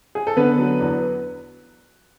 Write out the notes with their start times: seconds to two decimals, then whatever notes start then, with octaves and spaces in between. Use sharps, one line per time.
0.15 G#4
0.27 A4
0.37 D3 B3 B4
0.59 F#3
0.80 E2